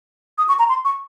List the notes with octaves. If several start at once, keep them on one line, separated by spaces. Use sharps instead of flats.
D#6
C#6
A#5
C6
C#6